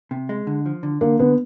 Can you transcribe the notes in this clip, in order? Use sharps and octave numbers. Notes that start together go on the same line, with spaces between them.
C3
G#3
D3
F3
D3
D3 A#3
D3 B3